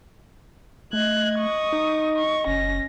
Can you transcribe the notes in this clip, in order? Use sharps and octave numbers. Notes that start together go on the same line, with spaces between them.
A3 D#5 F#6 G#6
C#6 D#6
D#4
C#6
F#1 C#4 A#6